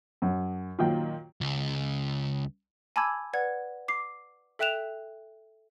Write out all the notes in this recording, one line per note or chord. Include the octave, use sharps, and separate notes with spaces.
F#2
A#2 D#3 F#3 F4 G5
C#2
G#5 A5 B5 D6 E6 G#6
B4 D5 F#5 G#6
D6 C7
A4 E5 G5 F#6 E7 F7